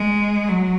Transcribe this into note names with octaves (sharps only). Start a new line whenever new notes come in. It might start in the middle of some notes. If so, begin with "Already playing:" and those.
Already playing: G#3
F#3